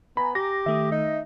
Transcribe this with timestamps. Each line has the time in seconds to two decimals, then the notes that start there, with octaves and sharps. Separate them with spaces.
0.17 B3 G#5 A#5 B5
0.35 G4 A#6
0.66 D#3 A3 E5 D#6
0.91 D#4